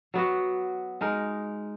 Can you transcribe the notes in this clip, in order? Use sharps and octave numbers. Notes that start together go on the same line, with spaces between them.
F#3 B3 F#4
G#3 D#4 A#4